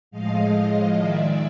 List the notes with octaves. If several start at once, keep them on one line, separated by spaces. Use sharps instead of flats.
A2 F3 G#3 D#5 F5
D#5 F5
D#3 G#3 D5 E5